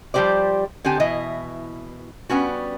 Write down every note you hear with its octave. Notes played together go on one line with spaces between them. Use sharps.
F3 G3 B3 G4 C5 D5
D3 C4 G4 G#5 A5
B2 E3 E4 D#5
G3 B3 C#4 F#4